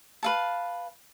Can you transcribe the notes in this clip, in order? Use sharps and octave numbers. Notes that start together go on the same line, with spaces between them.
B4 F5 A5